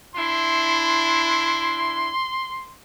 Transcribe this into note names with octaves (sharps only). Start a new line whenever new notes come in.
D4 E4 C6